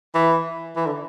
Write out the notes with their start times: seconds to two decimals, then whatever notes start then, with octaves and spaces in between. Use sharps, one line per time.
0.15 E3
0.76 E3
0.86 D3